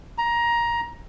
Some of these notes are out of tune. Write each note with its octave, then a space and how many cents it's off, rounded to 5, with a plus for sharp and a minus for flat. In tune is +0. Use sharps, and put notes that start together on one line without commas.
A#5 +15